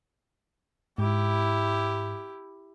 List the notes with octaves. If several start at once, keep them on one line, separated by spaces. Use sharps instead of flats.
G#2 E4 G4